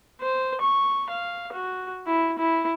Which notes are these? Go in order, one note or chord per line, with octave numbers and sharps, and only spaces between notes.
C5
C#6
F5
F#4
E4
E4